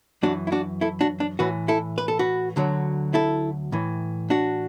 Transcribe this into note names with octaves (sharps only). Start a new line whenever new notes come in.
F#2 E3 D4 F#4
E4
D4 F#4
E4 A4
D4 F#4
D4
A2 E3 F#4 B4
E4 A4
B4
A4
F#4 B4
D2 D3 F#3
E4 A4
A2 E3
D4 F#4